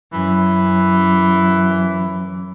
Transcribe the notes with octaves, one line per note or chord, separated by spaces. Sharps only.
F#2 E3